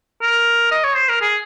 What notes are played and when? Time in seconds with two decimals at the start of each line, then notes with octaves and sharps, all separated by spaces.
0.22 A#4
0.71 D#5
0.84 C#5
0.96 C5
1.09 A#4
1.22 G#4